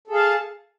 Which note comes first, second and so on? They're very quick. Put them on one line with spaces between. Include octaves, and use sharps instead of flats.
A4 G#4 F5 A5